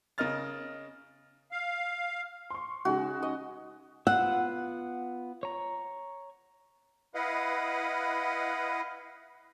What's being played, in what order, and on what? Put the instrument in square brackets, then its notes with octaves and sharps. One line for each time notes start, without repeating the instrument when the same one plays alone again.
[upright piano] C#3 A#4 D#5 F6 A6
[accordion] F5
[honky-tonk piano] C6 C#6
[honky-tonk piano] C#3 G#3 D#4 [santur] F#4
[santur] D#5
[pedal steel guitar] B3 F4 E6 [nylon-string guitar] F#5
[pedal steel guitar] C#5 A#5
[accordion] E4 B4 D#5 F5 F#5